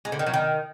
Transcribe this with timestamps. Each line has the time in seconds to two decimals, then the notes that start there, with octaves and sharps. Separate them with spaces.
0.05 G#3
0.12 D3
0.19 D#3
0.26 F#3
0.34 D#3